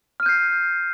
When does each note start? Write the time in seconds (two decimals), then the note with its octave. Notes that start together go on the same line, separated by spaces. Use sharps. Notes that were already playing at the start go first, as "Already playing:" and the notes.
0.20 F6
0.23 D#7
0.26 G6
0.29 C7